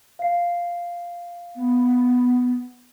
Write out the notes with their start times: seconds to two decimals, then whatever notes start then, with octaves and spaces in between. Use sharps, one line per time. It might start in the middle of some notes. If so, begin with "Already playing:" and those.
0.19 F5 C7
1.56 B3